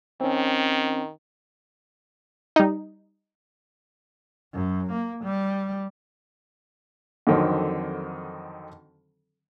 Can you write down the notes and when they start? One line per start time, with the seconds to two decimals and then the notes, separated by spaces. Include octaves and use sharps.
0.21 D#3 C4 C#4
2.56 G3 D#4
4.54 F#2
4.91 A#3
5.23 G3
7.27 F2 D3 D#3 F#3 C4